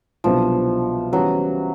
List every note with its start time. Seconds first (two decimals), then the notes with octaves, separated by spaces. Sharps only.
0.24 C2 B2 F3 F#3 B3 D4
1.12 C#3 E3 F#3 G3 B3